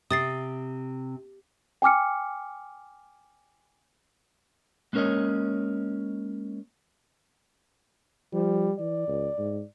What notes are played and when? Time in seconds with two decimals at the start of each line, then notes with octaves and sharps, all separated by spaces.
0.11 C3 D#6 A6 C7
1.82 G5 G#5 D6 F6 C#7
4.93 G#3 A#3 C#4 A#4 C#5 D#5
8.33 F3 G3
8.79 E3 D5
9.08 C#2
9.38 G#2